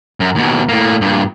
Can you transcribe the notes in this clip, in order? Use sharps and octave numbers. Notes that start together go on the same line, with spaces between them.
F#2
D#2 B2
A2 A#3
G2 A#2